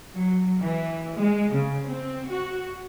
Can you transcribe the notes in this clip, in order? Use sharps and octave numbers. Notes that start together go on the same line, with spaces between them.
F#3
E3
G#3
C#3
C4
F#4